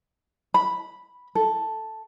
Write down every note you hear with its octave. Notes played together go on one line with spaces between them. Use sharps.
B5
A4